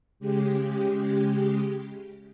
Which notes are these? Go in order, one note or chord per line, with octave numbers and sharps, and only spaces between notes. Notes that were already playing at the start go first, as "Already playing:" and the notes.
C#3 G#3 G4